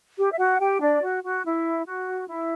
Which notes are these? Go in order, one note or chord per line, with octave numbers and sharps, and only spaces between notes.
G4
E5
F#4 F#5
G4 G5
D4 D5
F#4
F#4
E4
F#4
E4